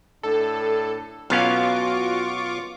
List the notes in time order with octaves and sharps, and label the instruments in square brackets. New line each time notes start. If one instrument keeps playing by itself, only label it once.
[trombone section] A2 D4 [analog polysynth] A4
[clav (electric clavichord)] B1 B3 C#4 [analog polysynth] F4 C#6 D6 [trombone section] F#4 [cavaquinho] F5